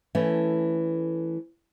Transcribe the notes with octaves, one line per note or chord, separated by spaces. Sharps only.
E3 A3 C#4